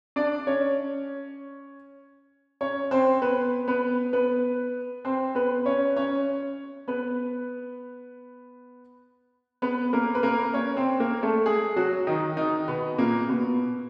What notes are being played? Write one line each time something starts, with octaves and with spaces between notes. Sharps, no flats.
D4 D5
C#4 C#5
C#4 C#5
C4 C5
B3 B4
B3 B4
B3 B4
C4 C5
B3 B4
C#4 C#5
C#4 C#5
B3 B4
B3 B4
A#3 A#4
B4
A#3 A#4
C#4 C#5
C4 C5
A#3 A#4
A3 A4
G#3 G#4
F#3 F#4
D#3 D#4
D#3 D#4
B2 B3
A#2 A#3
B2 B3